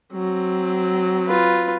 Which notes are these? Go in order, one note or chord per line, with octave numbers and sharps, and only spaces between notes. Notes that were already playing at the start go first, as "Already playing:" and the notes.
F#3 C4
F4 B4